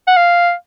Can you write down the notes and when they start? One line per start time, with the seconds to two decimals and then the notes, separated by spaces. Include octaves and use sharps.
0.07 F#5
0.17 F5